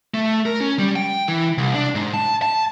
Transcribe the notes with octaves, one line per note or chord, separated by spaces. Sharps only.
A3
A#4
C#4
G3
G5
E3
C2
D4
G#2
A5
A5